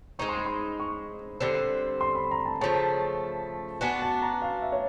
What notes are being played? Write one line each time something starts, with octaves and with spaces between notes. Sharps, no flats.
G#3 C4 D#4 C#6
C6
B5
C6
C#6
D3 G3 C4
C6
B5
A#5
A5
C#3 F3 A3 A5
B3 D4 F#4 G#5
A5
A#5
F5
E5
C#5